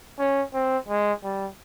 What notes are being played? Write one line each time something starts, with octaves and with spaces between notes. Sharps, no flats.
C#4
C4
G#3
G3